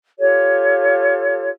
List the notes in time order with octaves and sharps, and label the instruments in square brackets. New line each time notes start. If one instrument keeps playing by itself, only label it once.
[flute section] F4 G4 A4 C#5